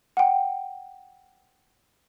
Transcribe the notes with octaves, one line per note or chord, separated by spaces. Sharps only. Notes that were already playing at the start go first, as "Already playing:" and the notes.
F#5 G5